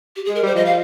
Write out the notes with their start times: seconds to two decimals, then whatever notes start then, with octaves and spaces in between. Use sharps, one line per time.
0.16 G4
0.25 G#4
0.29 G#3
0.35 A#4
0.43 G3 C5
0.55 F3 D#5
0.66 F5